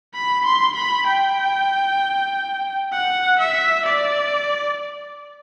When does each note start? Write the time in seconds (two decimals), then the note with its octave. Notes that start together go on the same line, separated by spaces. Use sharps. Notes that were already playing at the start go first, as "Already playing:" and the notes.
0.14 B5
0.45 C6
0.75 B5
1.07 G5
2.92 F#5
3.39 E5
3.85 D5